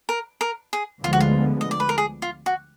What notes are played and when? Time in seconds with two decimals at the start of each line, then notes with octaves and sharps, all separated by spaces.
0.09 A#4
0.41 A#4
0.73 G#4
1.04 D2 D3 F3 G#3 B3 F4
1.13 F#4
1.20 F4
1.61 D#5
1.71 D5
1.80 B4
1.89 A#4
1.98 G#4
2.22 F4
2.46 F#4